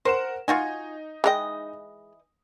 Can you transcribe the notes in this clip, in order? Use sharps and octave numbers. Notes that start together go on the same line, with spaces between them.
A#4 C5 F#5 E7
D#4 F4 F#4 G#5
E3 G#3 A#4 D#5 G5